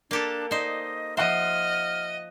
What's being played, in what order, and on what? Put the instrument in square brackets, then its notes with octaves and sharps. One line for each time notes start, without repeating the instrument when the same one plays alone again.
[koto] A#3 G4 A4 [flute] D4
[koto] D#4 C5 [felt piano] D5 [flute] D#5
[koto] F3 C5 [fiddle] D#5 [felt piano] E5 F#5 F#6 [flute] F6